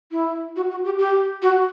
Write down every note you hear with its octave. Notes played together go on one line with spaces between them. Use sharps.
E4
F#4
F#4
G4
G4
F#4